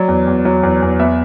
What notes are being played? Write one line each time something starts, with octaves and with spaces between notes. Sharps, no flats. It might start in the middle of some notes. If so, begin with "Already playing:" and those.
Already playing: F#3 D5
E2
E2
F#3
E2
E2
B3 E5